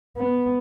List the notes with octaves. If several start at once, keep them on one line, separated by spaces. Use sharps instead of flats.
B3